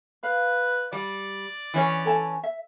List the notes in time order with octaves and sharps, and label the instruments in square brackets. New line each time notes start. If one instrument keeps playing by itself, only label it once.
[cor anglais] B4 [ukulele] F5
[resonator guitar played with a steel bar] G3 [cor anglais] D5
[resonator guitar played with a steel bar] E3 C#4 C#5
[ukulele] A4 G#5 A5
E5